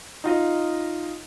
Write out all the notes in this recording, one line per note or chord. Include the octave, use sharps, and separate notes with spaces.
D#4 F4 D#5